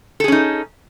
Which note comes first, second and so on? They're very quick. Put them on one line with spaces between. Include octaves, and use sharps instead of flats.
A4 G#4 C#4 D#4